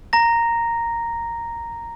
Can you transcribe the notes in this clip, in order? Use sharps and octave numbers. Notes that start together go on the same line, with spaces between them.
A#5 A#6